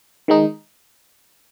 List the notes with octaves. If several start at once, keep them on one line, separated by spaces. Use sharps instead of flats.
D#3 G#3 D#4